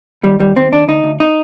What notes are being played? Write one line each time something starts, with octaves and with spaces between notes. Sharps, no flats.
D#2 G3
D#2 G3
D#2 C4
D#2 D4
D2 D#4
D2
D#4